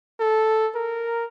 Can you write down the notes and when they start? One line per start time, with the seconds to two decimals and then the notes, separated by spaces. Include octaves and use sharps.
0.20 A4
0.75 A#4